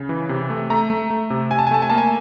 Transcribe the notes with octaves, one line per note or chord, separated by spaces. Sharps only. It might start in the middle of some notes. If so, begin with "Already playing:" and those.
Already playing: C#3
E3
C3
A3
A3 A#5
A3
A3
C3
C3 G#5
A5
G#5
A3 A5
G#5
A#3 A5
G#5